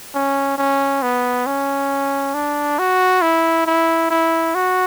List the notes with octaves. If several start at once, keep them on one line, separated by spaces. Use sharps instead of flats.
C#4
C#4
B3
C#4
D4
F#4
E4
E4
E4
F#4